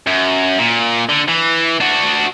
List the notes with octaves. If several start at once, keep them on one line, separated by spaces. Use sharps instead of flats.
F#2
A#2
D3
E3
D4 F#4